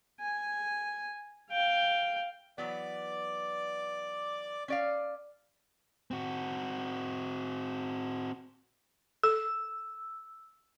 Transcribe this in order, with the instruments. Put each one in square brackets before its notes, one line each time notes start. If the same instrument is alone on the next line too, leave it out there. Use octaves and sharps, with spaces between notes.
[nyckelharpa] G#5
F5 G5
[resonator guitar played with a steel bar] E3 F#3 B3 [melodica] D5 D6
[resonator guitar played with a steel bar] C#4 D5 F5
[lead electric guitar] C4 F#4
[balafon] A4 [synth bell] E6